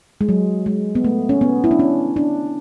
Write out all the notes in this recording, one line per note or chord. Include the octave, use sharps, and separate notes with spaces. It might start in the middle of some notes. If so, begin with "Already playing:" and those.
G#3
F#3
G#3
B3
A3
C#4
B3
E4
D4
C#4
D4